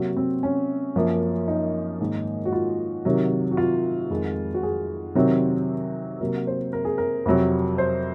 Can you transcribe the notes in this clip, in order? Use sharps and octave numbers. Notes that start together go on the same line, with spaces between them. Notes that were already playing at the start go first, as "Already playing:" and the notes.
Already playing: C3 F#3 A#3 F#4
C4
C#4
F#2 F3 A#3
D#4
G#2 D#3 A#3
F#4
F4
C3 D#3 F#3
F#4
F4
F2 D#3 G#3
F#4
G#4
C3 D#3 F#3 C4
C3 F#3 A#3 A#4
C5
A#4
G#4
A#4
F2 C3 F#3 C4
C5